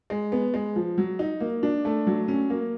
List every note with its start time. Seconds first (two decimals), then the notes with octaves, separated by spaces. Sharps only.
0.10 G#3
0.32 B3
0.54 G#3
0.76 F3
0.98 F#3
1.19 D#4
1.41 A#3
1.63 D4
1.85 A3
2.07 F#3
2.28 C#4
2.50 A#3